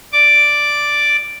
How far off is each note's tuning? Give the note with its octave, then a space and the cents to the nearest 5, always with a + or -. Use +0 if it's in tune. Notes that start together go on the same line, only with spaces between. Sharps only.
D5 +0 D6 +0